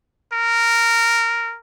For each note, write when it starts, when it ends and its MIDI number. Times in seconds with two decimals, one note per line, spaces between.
0.33 1.57 70